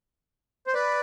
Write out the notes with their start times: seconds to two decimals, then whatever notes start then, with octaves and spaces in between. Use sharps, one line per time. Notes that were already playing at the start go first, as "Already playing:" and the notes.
0.67 C5
0.74 B4 D5